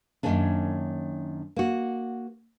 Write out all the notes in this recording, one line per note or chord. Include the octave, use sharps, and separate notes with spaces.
F#2 A2 D#3 A#3 C#4 D4
A#3 F#4